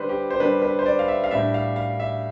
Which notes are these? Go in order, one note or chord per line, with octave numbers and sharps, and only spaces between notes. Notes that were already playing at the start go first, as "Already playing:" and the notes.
Already playing: D3 G3 D4 B4 C5
G4
C5
D3 G3 D4 B4
B4
C5
D5
F5
E5
F5
A2 G3 D4 E5
F5
F5
E5